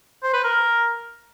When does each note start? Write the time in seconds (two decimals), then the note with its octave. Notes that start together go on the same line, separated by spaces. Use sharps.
0.23 C5
0.33 B4
0.44 A#4